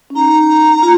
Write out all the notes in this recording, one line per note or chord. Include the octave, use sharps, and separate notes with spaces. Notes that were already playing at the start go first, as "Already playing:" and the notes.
C#4
D#4 A#5
F4